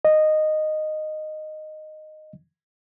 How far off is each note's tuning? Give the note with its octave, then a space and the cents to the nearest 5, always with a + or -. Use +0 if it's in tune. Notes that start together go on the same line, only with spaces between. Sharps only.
D#5 -10